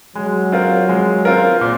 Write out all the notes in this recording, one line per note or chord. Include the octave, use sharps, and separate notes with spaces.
F#3 G#3
C4 F4 A#4
G#3
C4 F4 A#4
A#2